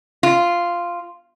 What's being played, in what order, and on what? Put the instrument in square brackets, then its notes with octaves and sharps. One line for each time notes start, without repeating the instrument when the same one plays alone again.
[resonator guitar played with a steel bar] F4